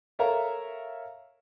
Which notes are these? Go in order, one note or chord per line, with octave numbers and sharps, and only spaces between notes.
A4 A#4 C#5 E5 F5 A#5